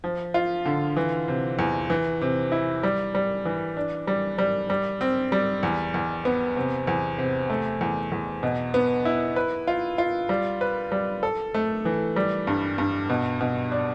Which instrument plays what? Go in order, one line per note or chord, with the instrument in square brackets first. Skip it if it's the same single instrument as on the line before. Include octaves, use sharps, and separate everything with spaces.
[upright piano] F3
F4
D3
E3
C3
E2
E3
C3
E4
G3
G3
E3
D4
G3
G3
G3
C4
G3
E2
E2
B3
C3
E2
C3
A3
E2
E2
B2
B3
E4
B4
F4
F4
G3
B4
G3
A4
A3
E3
G3
G2
G2
B2
B2
D4